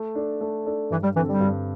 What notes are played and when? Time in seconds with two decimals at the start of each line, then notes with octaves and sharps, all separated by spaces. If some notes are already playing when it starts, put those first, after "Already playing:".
Already playing: A3
0.15 D4 A4 D5
0.41 A3
0.66 D4 A4 D5
0.90 G2 E3
1.03 G3
1.16 D3 E3 C4 A4
1.29 G3
1.40 G2